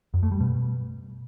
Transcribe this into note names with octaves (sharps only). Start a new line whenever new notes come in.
F#2
A3
G3
B2